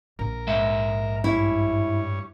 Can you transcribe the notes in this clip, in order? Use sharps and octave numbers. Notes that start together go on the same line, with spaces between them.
A#1 A#4
G#2 G#3 E5
G2 E4 C#5